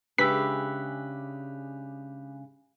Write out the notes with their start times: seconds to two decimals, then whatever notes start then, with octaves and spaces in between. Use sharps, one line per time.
0.18 C#3 G#3 D4 G4 B4 E5 B6